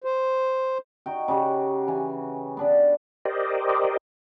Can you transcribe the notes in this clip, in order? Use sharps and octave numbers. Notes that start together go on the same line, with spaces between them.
C5
D#4 F#4 G5
C#3 F#4 G4 F#5
E3 G#5
B3 D4 B4
G4 A#4 C5 D5 D#5